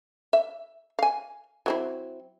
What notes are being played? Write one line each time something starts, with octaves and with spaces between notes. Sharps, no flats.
E5
F5 G#5
F#3 C4 E4